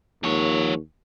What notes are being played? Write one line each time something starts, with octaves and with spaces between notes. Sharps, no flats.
D#2 F3 C#5